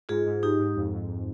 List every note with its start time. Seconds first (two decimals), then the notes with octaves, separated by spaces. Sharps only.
0.09 G#2 F4 G#4
0.26 G#2
0.43 G#2 D#4 G4
0.59 G#2
0.75 F2
0.93 F2